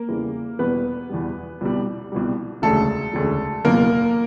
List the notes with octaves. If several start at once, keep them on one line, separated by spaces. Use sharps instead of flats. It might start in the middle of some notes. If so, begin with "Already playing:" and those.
Already playing: A#3 A#4
E2 C#3 E3 G3
E2 B2 G3 B3 B4
E2 B2 G3
C2 B2 G3
C2 B2 G3
E1 D2 C#3 A3 A4
E1 D2 C#3
F#1 E2 B2 A#3 A#4